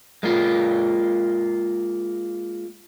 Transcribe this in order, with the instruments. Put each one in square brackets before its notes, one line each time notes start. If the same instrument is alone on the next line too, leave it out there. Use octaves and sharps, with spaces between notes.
[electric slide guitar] G#3 A#3 F4